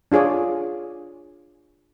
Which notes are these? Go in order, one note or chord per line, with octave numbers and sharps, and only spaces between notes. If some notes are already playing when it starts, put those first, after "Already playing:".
D4 F4 G#4 C#5 D5